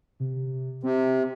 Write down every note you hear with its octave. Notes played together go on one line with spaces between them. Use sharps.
C3
C3 C4